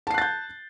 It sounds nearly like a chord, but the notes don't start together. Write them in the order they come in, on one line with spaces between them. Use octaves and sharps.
A5 C7 F#6 A6 G6